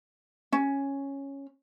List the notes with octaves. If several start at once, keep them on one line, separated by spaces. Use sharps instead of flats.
C#4